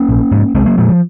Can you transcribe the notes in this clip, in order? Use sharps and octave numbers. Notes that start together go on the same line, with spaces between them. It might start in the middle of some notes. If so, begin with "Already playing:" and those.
Already playing: A#3 C#4
A#1
G#2
C2 G#3 C4
F#3 A#3
A#2 F3 G#3
F3